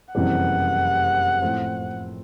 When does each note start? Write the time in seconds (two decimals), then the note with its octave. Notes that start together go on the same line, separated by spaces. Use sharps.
0.14 F#1 F2 C3 E3 G3 F#5
1.42 A2 F3 A3 C4